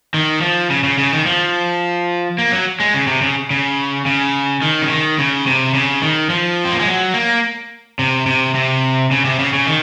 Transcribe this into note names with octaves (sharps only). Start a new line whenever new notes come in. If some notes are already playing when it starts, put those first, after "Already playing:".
D#3
F3
C#3
C#3
C#3
D#3
F3
A#3
F#3
G#3
C#3
C3
C#3
C#3
C#3
D#3
C#3
D#3
C#3
C3
C#3
D#3
F3
C4
A#3
G#3
F#3
A#3
C3
C3
C3
C#3
C3
C#3
C#3
D#3